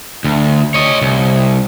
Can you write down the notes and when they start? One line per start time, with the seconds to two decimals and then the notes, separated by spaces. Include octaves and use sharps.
0.24 D2
0.74 C#5 D#5
1.01 C2